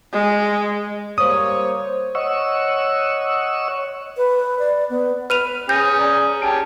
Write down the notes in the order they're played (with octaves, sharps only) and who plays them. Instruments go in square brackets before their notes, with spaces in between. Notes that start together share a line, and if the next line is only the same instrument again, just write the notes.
[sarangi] G#3
[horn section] G3 A#3 C#5 [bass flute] C5 [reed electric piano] D#6
[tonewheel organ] C#5 D#5 F#5 C#6 E6
[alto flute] B4
D5
B3
[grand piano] B4 [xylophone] F6 D#7 F7
[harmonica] C#4 G#4 [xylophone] G6 A#6
[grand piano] D5 A#5
[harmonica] C#4 G4 [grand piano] A5 D7